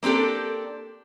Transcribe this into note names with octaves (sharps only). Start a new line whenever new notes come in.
A#3 C4 D4 G4 A4